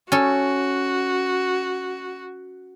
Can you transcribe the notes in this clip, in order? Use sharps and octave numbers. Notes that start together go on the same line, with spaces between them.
C#4 F#4 A4